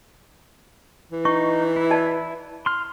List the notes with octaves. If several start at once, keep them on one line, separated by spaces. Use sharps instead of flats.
E3
D#4 C#6
E4
D5 D#5 A5
C6 F6